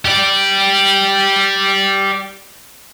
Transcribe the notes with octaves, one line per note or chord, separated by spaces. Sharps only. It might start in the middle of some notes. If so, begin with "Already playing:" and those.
G4 D5